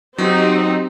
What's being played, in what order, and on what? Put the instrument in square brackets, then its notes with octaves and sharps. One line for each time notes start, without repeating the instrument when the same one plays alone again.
[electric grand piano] F#3 [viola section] C4 D#4 G4